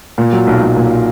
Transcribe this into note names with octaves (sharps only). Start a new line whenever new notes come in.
A#2
F#3
B1
B1
A#2